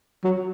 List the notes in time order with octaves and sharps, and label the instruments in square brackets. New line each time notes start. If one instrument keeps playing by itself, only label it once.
[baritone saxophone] F#3